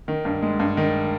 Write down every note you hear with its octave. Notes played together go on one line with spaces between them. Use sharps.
D#3
G2
G#3
G2
D#3